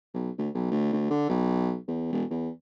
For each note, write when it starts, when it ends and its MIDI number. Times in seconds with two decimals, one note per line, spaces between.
0.14 0.30 35
0.38 0.49 38
0.54 0.69 35
0.71 0.92 38
0.93 1.06 38
1.10 1.27 50
1.29 1.76 35
1.88 2.09 40
2.12 2.24 28
2.30 2.49 40